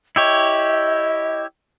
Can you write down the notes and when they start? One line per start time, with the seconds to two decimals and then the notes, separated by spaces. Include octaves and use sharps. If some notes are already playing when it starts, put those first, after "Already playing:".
0.16 E4 G4 C#5 D#5